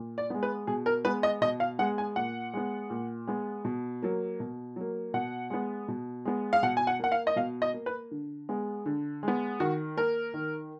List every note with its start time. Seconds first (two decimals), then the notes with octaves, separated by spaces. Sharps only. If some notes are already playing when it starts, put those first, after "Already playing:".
Already playing: A#2
0.18 D5
0.30 G#3 B3
0.43 B4
0.67 B2 G#4
0.86 A#4
1.05 G#3 B3 B4
1.23 D#5
1.41 B2 D#5
1.60 F5
1.79 G#3 B3 F#5
1.98 G#5
2.16 A#2 F#5
2.54 G#3 B3
2.90 A#2
3.27 G#3 B3
3.65 B2
4.03 F#3 A#3
4.40 B2
4.76 F#3 A#3
5.14 B2 F#5
5.50 G#3 B3
5.88 B2
6.25 G#3 B3
6.53 F5
6.63 B2 F#5
6.77 G#5
6.87 F#5
7.00 A#3 F#5
7.12 F5
7.27 D#5
7.36 B2 F5
7.62 D#5
7.74 A#3
7.86 B4
8.11 D3
8.49 G#3 B3
8.86 D3
9.23 G#3 B3
9.60 D#3 F#4
9.97 A#3 A#4
10.34 D#3